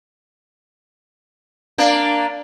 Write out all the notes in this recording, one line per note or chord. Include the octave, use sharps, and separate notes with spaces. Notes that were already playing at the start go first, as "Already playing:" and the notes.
A#3 D4